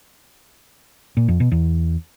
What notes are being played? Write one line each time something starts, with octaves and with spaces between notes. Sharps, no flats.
A#2
F2
B2
E2